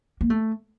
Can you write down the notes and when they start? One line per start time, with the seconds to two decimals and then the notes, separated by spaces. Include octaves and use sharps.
0.21 A#3
0.30 A3